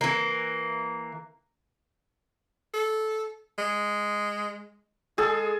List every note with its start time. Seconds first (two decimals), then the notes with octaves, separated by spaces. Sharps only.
0.01 E3 A#3
2.74 A4
3.58 G#3
5.18 G#3 G#4 A4